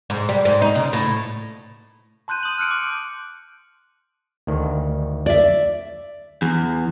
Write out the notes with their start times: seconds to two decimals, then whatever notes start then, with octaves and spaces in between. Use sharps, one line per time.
0.10 G#2
0.29 G3
0.45 G#2
0.62 D#4
0.75 C#3
0.93 A2
2.28 A5 C6 F#6 G6 D#7
2.43 D#6 D#7 F#7
2.58 F6 F#6 C#7 D7
2.71 D6
4.47 D2 D#3
5.26 D5 E5
6.42 E2